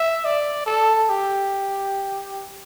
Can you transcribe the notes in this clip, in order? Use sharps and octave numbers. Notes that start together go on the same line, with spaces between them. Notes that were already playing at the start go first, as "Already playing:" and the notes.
Already playing: E5
D5
A4
G4